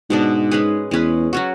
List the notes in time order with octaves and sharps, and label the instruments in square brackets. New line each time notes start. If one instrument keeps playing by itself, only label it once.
[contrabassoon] G#2 [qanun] B2 G#3 D4
[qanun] G#3 C#4 G#4 B4
[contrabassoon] E2 [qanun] G#3 C#4 G#4 B4
[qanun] F#3 C#4 F#4